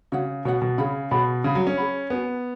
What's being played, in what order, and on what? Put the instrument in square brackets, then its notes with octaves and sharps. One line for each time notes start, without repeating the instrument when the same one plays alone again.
[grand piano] C#3 [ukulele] F#4 C#5 F#5
[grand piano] B2 [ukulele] F#4 C#5 F#5
[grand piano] B2
[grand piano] C#3 [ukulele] G#4 C#5 F#5 B5
[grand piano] B2 [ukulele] G#4 C#5 F#5 B5
[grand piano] C#3 [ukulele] G#4 C#5 F#5 B5
[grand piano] F#3
C#4
[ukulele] G#4 C#5 F#5 B5
[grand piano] B3 [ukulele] F#4 B4 G#5